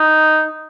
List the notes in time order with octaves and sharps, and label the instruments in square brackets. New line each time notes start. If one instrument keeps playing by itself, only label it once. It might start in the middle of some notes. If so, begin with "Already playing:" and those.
Already playing: [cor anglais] D#4